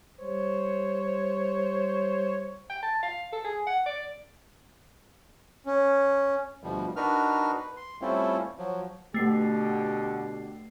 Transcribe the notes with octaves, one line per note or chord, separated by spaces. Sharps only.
G3 C5 C#5
G5
A5
F5
A4
G#4
F#5
D5
C#4
D2 B2 F3 G3
D4 D#4 F#4 A#4 B4 F6
B4
C6
G3 A3 C4 C#4 E4 F4
F3 F#3
B2 D3 A3 G4 C7